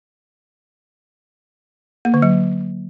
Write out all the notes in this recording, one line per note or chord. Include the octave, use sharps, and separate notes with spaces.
A#3
D3
F#3